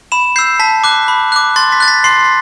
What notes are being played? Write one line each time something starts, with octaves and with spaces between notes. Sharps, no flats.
B5 E7
E6 G6 C7
A5 B6
D6 F#6
B5
D6 F#6
C6 A6
B6
F#6 A6
B6
C6 C7